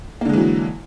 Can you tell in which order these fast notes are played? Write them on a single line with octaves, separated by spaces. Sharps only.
A#3 D3 G#3 E3 F#3